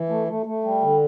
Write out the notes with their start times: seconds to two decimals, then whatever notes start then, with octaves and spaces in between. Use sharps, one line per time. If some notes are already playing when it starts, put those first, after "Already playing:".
Already playing: E3
0.09 A3
0.28 A3
0.46 A3
0.64 G3
0.82 D3